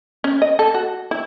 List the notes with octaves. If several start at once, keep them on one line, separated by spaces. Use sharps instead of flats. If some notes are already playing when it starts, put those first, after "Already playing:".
C#4
D#5
A4
F#4
E4